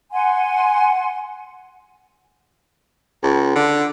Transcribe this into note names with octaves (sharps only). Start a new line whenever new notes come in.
F#5 G#5 C6
C#2
D3